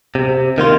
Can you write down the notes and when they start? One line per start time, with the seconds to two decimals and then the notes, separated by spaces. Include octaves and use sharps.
0.15 C3
0.58 D#3 A#3 F4